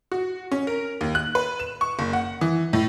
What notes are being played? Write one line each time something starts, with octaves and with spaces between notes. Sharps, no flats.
F#4
C#4
A#4
D#2
F#6
B4
E7
C#6
F#1
F#5
E3
A2